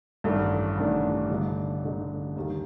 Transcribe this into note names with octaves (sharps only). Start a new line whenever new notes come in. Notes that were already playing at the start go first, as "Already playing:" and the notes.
A1 G2 D#3 A3 D4
A1 G2 D#3 A3 D4
G1 G2 D3 A3 D#4
G1 G2 D3 A3 D#4
D#2 D#3 G3